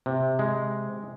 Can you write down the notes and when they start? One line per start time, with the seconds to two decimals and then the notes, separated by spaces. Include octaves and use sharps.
0.06 C3
0.39 G#3